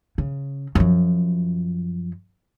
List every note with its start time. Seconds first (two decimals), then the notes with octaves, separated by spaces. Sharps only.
0.18 C#3
0.75 F#2 F3